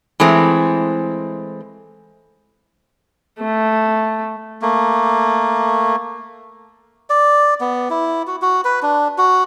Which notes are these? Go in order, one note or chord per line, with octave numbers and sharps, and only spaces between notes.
E3 G#3 A3 C4
A3
A3 A#3
D5
B3
E4
F#4
F#4
B4
D4
F#4